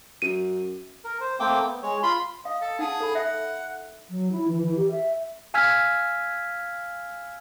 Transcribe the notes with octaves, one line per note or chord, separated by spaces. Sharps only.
F#2 D#7
A#4
C5
A3 A#3 C4 G5 D6
B3
G#3 C#5
F4 B5 C6
D#5 F5
A4
D#4 G#4 F#5 A5
A4 B5
E5 F#5
F#3
E4
E3
E3
G4
E5
F5 G#5 E6 F6 G#6 B6